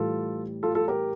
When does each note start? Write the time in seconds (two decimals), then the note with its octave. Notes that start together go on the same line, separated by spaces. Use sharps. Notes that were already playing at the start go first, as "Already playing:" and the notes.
Already playing: A2 E3 G3 F4 A4
0.63 F4 A4
0.75 F4 A4
0.88 G4 A#4